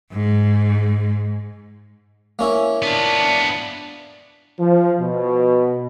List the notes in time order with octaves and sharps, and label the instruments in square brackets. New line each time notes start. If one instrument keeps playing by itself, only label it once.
[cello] G#2
[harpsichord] A#3 C#4 E4
[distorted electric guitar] B3 F4 [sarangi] D4
[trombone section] F3
B2